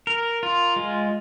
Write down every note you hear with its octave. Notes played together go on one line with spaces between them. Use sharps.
A#4
F4
G#3